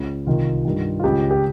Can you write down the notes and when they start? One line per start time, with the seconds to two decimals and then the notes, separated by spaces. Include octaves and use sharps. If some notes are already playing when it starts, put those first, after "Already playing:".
Already playing: C#2 C#3
0.27 C2 C3 D#3 F4
0.65 G2 D#3
0.99 F4
1.03 C#2 C#3 G4
1.30 G4